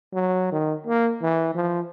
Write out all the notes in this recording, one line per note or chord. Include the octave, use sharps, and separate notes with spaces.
F#3
D#3
A#3
E3
F3